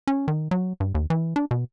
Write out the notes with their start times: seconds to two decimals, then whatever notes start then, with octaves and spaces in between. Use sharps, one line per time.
0.07 C#4
0.28 D#3
0.51 F#3
0.80 G2
0.95 D#2
1.10 E3
1.36 D4
1.51 B2